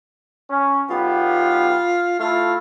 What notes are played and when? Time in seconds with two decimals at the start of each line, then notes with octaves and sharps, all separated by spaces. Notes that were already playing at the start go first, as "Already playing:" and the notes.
0.50 C#4
0.90 B1 B3 F4 G4
2.20 A3 E4 F4 A4